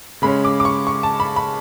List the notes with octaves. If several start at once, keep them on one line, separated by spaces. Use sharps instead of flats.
C#3 G#3 C#4 B5
D6
D6
C#6
C#6
A5
B5
B5